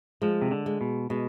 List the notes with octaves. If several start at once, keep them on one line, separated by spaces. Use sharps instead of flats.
F3 G#3
C3
D3
G#3
B2
B2 G#3